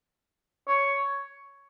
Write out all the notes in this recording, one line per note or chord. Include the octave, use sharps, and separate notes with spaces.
C#5